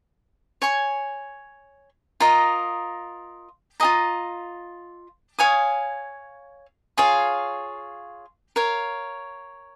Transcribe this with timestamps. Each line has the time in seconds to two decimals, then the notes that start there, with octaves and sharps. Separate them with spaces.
0.62 C#5 G#5 C#6
2.20 F4 A#4 D#5 A#5
3.80 F4 G#4 D#5 A#5
5.39 C#5 F5 G#5 D#6
6.97 F4 G#4 C#5 F5
8.56 A#4 C#5 F5